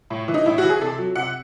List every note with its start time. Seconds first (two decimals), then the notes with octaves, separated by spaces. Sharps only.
0.10 A2
0.28 E3
0.34 D#4
0.46 A2 E4
0.58 F#4
0.64 E3
0.70 G#4
0.81 C3 A4
0.98 F#3
1.16 C3 F#5